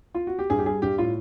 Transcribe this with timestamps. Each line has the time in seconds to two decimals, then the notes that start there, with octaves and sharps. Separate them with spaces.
0.15 F4
0.27 F#4
0.39 G4
0.50 G2 G#4
0.59 G4
0.66 G3 G#4
0.82 G2 G4
0.98 A2 F4